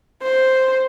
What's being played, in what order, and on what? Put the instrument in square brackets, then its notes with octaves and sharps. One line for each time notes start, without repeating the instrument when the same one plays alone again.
[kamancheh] C5